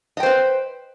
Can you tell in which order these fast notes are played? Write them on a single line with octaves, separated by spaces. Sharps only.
D#5 G5 C5 B4